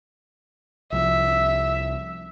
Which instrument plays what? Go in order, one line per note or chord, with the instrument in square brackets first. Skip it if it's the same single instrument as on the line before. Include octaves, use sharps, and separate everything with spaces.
[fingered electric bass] C2 F3 [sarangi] E5